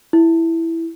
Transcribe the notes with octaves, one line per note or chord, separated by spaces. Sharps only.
E4